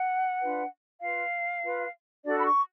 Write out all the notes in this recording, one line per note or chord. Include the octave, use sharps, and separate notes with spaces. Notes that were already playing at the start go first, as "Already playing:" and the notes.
Already playing: F#5
D4 F4 B4
F4 B4 F5
F4 B4
D4 F#4 A4 D5
B5
C#6